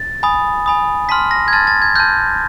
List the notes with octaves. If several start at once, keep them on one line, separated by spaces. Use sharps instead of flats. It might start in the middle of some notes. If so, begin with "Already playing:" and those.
Already playing: A6
G#5 B5 D#6
G#5 B5 D#6
A5 C6 F6 B6
A#6
G#6
A5 C6 F6 A6
A6
G#6
A5 C6 F6 G6